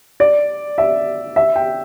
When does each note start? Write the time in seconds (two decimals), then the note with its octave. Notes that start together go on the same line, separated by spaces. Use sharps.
0.20 D5
0.78 E5
1.36 E5
1.56 G5